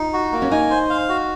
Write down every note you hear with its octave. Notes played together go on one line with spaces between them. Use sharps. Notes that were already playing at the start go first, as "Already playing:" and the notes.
Already playing: D#4 F4
F#4
A#3
C#4
D#4 G#5
C5
F5
F#4